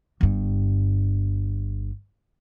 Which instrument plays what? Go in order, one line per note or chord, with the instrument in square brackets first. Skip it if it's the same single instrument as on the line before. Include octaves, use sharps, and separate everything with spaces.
[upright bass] G1 G2